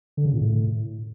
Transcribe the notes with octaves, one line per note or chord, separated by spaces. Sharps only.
D3
C#3
A#2
A2